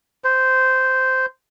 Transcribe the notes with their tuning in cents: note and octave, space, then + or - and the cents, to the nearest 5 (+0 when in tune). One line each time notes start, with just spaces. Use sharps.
C5 -10